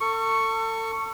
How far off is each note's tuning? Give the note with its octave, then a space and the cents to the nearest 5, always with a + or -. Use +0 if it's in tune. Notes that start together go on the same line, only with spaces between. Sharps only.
A4 +35 C#6 +0